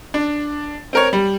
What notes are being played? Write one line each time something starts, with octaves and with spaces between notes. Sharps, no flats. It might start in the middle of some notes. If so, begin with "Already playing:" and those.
D4
C4 A#4 C#5
G3